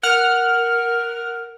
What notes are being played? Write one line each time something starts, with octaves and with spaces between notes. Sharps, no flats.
A#4 F#5 F6